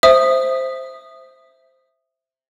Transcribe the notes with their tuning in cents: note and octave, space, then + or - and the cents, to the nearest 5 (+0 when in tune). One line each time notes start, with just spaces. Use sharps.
C5 +0 E5 +0 D#6 -15